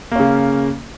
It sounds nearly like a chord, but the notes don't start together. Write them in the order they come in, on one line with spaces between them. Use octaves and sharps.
A#3 C#4 C#3